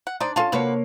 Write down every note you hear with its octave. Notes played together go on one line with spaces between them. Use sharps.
F#5
D4 D#4 C5 D5
C#4 F4 A4 F5 A5
C3 F3 A#3 F#4 B4 C#5